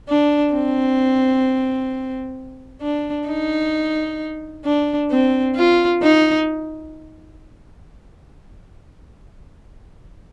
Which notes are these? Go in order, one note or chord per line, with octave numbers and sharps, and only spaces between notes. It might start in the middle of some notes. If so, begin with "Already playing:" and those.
D4
C4
D4
D#4
D4
C4
F4
D#4